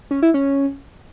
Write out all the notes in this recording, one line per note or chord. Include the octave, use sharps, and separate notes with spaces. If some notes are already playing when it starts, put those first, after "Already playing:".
C#4
E4
C#4